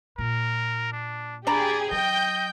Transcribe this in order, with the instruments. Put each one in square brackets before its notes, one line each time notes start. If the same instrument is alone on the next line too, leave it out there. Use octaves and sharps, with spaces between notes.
[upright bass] A#2 [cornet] A#4
[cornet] D4
[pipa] D4 A#5 B5 [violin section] G4 G#4 [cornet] D5
[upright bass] F#3 [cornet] D#5 [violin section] G5 G6